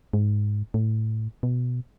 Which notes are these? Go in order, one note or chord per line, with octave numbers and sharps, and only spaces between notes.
G#2
A2
B2